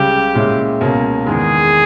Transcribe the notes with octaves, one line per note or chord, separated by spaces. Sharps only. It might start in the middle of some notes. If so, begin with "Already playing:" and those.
Already playing: C#2 C#3 G3 G4
A#2 G#3 C#4 E4
C#2 B2 A#3 C#4
E2 D#3 G#3 G#4